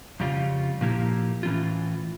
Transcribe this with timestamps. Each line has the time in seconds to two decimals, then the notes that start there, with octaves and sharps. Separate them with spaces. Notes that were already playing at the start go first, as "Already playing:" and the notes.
0.20 F2 C#3 G3 C#4 F4
0.81 A#2 F3 A#3 E4 G4
1.43 A2 E3 G3 C#4 F4